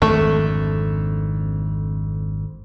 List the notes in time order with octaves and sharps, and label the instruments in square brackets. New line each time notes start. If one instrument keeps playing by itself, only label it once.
[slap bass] G#1 F2 D3 [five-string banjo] A3